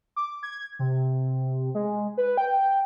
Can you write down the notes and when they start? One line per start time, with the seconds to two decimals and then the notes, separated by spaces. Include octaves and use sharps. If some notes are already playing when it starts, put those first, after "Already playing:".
0.16 D6
0.43 G#6
0.79 C3
1.75 G#3
2.17 B4
2.37 G5